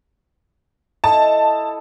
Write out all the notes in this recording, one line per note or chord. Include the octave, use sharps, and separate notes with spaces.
E4 A4 D#5 A5